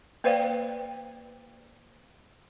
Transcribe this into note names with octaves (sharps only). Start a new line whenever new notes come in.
A#3 B4 C5 D5 F5 G5